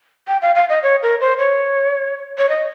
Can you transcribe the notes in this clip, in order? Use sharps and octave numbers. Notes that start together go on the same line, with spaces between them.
G5
F5
F5
D#5
C#5
A#4
C5
C#5
C#5
D#5